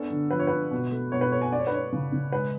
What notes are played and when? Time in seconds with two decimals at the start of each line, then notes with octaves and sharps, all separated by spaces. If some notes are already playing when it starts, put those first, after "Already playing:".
Already playing: B3 C#4 D4 A4
0.10 D3
0.31 F3 B4
0.39 C#5
0.47 C#4 B4
0.71 B2
0.91 A3
1.12 B2 C#5
1.21 B4
1.32 A3 C#5
1.42 G#5
1.51 C#4 D5
1.59 C#5
1.67 B4
1.72 C#4 C#5
1.92 C#3
2.12 C#3
2.32 G#3 B4